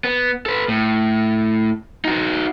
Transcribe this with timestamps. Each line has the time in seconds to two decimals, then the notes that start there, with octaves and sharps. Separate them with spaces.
0.04 B3
0.46 A4 B4
0.68 A2
2.05 D#4 F#4